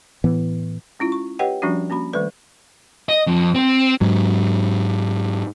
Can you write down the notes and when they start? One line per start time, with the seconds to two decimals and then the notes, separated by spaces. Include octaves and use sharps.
0.24 A2 E3 B3
0.99 G#3 C#4 E4 F4
1.12 C#6
1.39 G4 B4 C#5 D#5 F#5 G5
1.62 F3 G3 C#4 D4 F#4
1.90 A#3 C#4 F#4 B5
2.13 D#3 G3 A3 A4 B4 D5
3.09 D#5
3.27 F2
3.55 C4
4.01 G#2 F#3